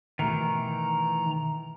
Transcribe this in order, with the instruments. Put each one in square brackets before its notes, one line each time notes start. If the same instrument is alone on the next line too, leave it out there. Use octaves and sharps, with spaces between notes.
[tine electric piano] B2 A3 F6 [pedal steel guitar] D#3 E3 [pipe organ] A#5